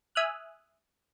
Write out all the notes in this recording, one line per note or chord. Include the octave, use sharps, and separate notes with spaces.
E5 G#5 D#6 F6 F#6